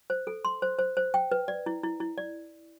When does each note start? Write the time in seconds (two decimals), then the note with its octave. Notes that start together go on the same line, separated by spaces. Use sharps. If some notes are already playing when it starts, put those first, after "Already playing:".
0.10 C5
0.27 A4
0.45 C6
0.62 C5
0.79 C5
0.97 C5
1.14 G5
1.32 B4
1.48 D5
1.66 E4
1.83 E4
2.00 E4
2.18 D5